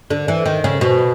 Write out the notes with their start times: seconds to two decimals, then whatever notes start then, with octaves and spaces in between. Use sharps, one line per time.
0.10 D3
0.28 E3
0.46 D#3
0.64 C#3
0.81 B2